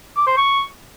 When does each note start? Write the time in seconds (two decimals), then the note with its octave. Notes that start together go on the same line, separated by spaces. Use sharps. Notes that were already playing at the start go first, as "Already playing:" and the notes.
0.16 D6
0.27 C5
0.37 C#6